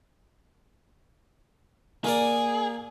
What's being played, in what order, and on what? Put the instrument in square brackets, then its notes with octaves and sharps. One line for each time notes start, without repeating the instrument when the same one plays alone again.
[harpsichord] A#3 A#4 D5 [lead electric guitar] G#4